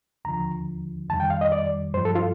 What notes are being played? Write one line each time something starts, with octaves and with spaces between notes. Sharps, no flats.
D#2 D3 F3 A#5
F2 D#3 G3 A5
G5
F5
D#5
D5
G2 F3 C5
A4
F4